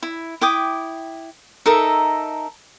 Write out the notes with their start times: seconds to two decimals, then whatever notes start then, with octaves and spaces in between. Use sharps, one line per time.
0.03 E4
0.41 E4 G5 D6 D#6
1.66 D#4 A4 A#4 E5